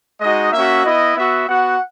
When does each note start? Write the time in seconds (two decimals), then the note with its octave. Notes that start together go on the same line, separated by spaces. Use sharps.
0.21 G#3 D#4 F#4 D#5
0.53 A#3 C#4 F#4 E5
0.85 B3 E4 D#5
1.17 B3 F#4 E5
1.49 B3 F#4 F#5